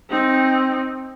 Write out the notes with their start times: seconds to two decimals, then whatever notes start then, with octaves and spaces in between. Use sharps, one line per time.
0.10 C4 D#4